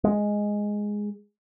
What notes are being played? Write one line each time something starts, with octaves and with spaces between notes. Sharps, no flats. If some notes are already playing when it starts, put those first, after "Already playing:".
G#3